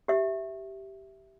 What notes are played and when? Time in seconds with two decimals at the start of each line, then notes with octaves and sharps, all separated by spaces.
0.08 G4 E5